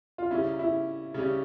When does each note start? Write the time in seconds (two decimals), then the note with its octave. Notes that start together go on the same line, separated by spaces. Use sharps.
0.18 F4
0.31 C#3 G3 C#4 E4
0.59 E4
1.14 C#3 G3 C#4